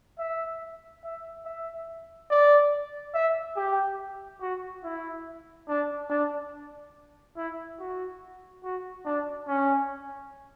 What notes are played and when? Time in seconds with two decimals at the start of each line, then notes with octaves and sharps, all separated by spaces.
0.19 E5
1.04 E5
1.46 E5
2.31 D5
3.14 E5
3.57 G4
4.41 F#4
4.84 E4
5.69 D4
6.10 D4
7.37 E4
7.80 F#4
8.64 F#4
9.06 D4
9.48 C#4